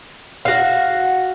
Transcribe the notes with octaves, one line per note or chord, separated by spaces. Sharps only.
F#4 F5